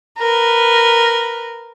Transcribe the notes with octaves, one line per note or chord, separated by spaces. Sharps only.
A#4 B4